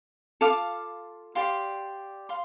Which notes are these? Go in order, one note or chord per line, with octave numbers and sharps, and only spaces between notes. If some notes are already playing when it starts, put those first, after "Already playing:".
F4 A4 F5 D6
G4 D5 F5 C6
F5 C6